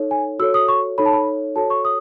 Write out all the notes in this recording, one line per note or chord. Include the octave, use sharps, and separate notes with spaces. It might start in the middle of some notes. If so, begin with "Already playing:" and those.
Already playing: D#4 A4 C#5
G#5
F#4 A4 C#5 E6
D#6
C#6
D#4 A4 C#5 B5
A5
B5
F#4 A4 C#5 A5
C#6
D#6